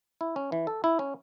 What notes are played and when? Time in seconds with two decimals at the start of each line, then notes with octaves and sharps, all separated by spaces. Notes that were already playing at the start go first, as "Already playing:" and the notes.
0.21 E4
0.36 C#4
0.52 E3
0.67 A4
0.84 E4
0.99 C#4